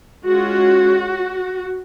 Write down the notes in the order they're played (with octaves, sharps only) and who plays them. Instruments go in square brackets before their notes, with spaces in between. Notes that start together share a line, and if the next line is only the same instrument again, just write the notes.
[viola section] G#3 C#4 F4 F#4